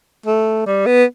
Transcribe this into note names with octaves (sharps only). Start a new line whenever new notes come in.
A3
G3
B3